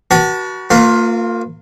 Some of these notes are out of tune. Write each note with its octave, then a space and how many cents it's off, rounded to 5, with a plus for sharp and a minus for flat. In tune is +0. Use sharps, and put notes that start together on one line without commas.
F#4 +20 B4 -45 A5 +0
A#3 -30 F4 +15 B4 +15